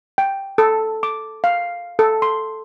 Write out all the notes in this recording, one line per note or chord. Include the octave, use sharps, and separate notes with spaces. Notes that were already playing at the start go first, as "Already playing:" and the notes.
G5
A4
D6
F5
A4
C6